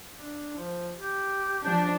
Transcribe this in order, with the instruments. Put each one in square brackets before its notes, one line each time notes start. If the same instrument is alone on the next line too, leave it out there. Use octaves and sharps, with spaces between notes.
[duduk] D4
F3
G4
[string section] F3 D4